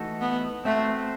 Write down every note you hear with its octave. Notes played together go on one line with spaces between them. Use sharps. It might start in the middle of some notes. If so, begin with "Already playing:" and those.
Already playing: E3 A3 D#4 F#4 A4
B3
A3 C4 F#4 C5